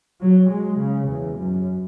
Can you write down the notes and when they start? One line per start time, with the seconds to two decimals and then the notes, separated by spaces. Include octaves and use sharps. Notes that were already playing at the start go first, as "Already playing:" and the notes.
0.21 F#3
0.50 G#3
0.79 C#3
1.08 E2
1.37 F#2